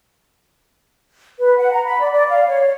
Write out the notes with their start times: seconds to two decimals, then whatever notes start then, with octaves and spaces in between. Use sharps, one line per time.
1.39 B4
1.58 F#5
1.72 A#5
1.84 B5
2.01 D5
2.12 D5
2.28 F5
2.48 C#5